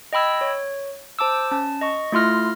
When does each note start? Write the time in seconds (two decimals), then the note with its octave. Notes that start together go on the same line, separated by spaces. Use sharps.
0.13 D#5 G5 B5 E6 G#6
0.41 C#5
1.19 C5 A5 D6 E6
1.51 C#4 A5
1.81 D#5 C#6
2.12 A3 E4 F4 C6 F6 A#6